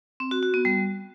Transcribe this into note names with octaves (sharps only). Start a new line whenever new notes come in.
C4
F#4
F#4
B3
G3